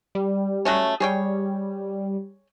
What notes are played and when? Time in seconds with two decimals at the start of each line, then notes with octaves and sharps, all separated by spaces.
0.15 G3
0.65 F#3 A3 C#4
1.00 G3 G#4 C#5 G5